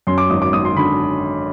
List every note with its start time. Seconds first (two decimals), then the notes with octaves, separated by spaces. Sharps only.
0.07 F#2 C6
0.18 D6
0.30 G#1 D#6
0.42 D6
0.53 G#1 D#6
0.65 C6
0.76 D3 B5